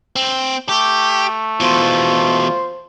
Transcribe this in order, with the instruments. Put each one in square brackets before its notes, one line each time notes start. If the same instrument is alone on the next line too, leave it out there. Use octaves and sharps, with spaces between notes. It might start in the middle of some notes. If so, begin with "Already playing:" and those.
[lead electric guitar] C4
[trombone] A3 [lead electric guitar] G4
[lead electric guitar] E2 B2 [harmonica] F4 C5